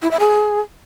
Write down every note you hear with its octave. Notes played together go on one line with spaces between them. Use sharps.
E4
E5
G#4